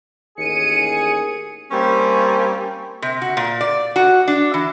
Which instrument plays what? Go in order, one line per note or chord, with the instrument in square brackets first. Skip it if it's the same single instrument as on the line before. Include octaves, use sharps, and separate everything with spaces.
[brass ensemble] A1 D#2 G#4 [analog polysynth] C#7 D#7
[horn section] G3 A#3 C4 C#4
[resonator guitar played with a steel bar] C3
F#4
A#2
D5
F#4
D4
E3